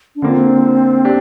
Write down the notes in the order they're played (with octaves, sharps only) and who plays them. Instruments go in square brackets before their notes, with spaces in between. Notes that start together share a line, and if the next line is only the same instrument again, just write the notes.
[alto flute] D4
[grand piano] D3 A#3 F4 [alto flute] C4
[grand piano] D4 G4